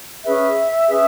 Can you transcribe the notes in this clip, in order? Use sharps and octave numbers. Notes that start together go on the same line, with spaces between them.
C#4 G#4 B4 E5
C#4 G#4 B4